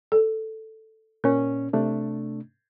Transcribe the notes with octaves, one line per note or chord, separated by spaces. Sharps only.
A4
A#2 C#4 A#4
C3 A3 D4